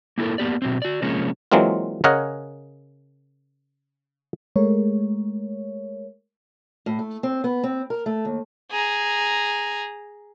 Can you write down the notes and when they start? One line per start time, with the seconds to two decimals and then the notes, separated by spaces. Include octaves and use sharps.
0.18 A#3 E4 F#4 A4 A#4
0.38 A#3 B3 G4 D5
0.62 B2 F#3 C4
0.82 F#4 D5
1.02 C3 F3 G#3 A#3 C#4
1.52 E3 F#3 G#3 A#3 C4 F4
2.04 C#3 C#4 A#4 D#5 F#5 G#5
4.56 G#3 A3 A#4 C#5
6.86 A2
6.99 A3
7.23 C4
7.44 B3
7.64 C4
7.90 A#4
8.06 A3
8.25 D#2
8.71 G#4 A#5